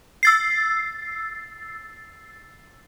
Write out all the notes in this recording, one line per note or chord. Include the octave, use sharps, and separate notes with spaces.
E6 A6 C7